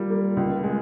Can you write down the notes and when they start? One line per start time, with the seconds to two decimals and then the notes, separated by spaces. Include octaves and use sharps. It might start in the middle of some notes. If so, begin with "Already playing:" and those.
Already playing: G3 A#3 F4
0.10 A#3
0.37 C#2
0.64 G#3